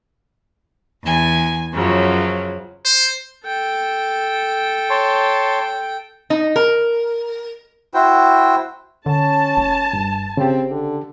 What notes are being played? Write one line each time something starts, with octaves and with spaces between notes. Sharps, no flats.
E2 G#5
F#2 C#3 F3 F#3
C5
A4 G5
C#5 A5 C6
D#4
A#4
E4 F#4 C5 G5
D3 C#4 A5
F#1
G2
C#3 C4 G4
D3